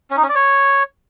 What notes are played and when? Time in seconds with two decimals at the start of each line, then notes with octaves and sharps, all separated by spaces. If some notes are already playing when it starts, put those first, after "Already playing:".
0.11 C#4
0.17 D#4
0.23 C#4
0.29 D5
0.35 C#5